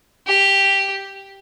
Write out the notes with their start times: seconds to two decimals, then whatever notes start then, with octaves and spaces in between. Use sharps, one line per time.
0.27 G4